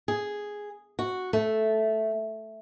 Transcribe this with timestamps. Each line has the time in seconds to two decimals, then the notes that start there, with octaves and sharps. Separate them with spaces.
0.08 G#4
0.99 F#4
1.33 A3